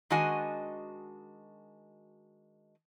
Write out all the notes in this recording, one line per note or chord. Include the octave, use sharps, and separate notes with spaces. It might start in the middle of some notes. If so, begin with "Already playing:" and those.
D#3 G#3 D4 F#4 D#5 G#5